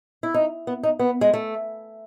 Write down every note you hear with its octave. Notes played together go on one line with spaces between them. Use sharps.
E4
D#4
B3
D#4
B3
G#3
A3